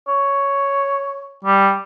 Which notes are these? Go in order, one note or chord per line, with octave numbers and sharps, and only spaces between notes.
C#5
G3